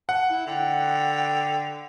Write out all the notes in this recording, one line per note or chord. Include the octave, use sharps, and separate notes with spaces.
F#5 A5
E4
D3 G5